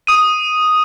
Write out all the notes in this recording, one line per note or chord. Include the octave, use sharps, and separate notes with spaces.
D#6 D#7